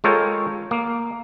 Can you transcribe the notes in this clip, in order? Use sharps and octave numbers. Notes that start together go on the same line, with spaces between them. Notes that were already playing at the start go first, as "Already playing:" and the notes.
G#3 F4 A4 A#4 C#5 G5
A#3